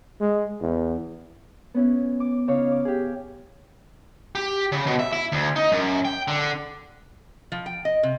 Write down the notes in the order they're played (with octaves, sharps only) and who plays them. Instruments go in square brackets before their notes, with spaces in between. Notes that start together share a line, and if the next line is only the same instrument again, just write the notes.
[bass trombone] G#3
E2
[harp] B3 C#4 E4
D6
C#3 D#4 C#5 F5
D6
G4 G#4
[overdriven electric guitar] G4
C#3
B2
E5
E4
D2
D#4
F#2
G5
D3
[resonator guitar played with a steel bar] F3
G5
D#5
C3